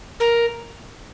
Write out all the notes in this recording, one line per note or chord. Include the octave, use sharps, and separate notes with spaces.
A#4